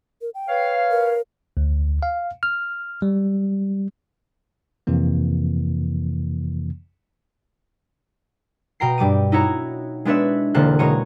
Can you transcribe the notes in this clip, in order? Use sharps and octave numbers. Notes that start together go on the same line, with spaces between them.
A#4
G5
B4 C#5 F5
A#4
D2
F5
F6
G3
F2 C3 E3 A#3
B2 G5 A#5 C7
G2 G3 D6 D#7
D#4 E4 F#4 C#5 A#5
G#3 B3 D4 B4 C#5 E5
E1 D3 A#3 C5 A5 F#6
B2 G#3 C#5 A#5 C#6 D#7